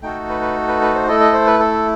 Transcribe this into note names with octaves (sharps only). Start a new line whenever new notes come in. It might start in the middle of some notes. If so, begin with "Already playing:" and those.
A3 D#4 F#4 A4 G5
B4
B4
B4
B4
C5
A3 E4 A4 D#5
D#5
C5
B4
A4